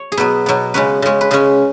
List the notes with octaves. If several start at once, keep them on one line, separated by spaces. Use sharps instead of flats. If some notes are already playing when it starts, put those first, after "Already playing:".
Already playing: C#5
G#4
B2 F#3 B3 B4
B2 F#3 B3
C#3 G#3 C#4 B4
C#3 G#3 C#4
B4
C#3 G#3 C#4 G#4